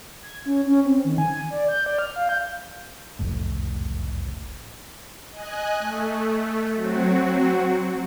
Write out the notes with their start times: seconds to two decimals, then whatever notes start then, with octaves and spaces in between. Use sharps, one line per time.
0.23 G#6
0.46 C#4
0.67 C#4
0.85 C4
1.05 D#3
1.18 G#5
1.50 D5
1.68 G6
1.86 D5
1.99 F6
2.16 F5
2.29 G6
3.19 F#1 C2 F2 A2
5.31 D#5 G#5 F#6
5.80 A3
6.75 F#3 C4 F#4